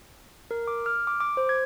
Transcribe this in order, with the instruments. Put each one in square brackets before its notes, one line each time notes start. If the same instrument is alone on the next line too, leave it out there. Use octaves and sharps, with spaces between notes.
[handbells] A#4
D6
F6
D6
D6
C5
G#6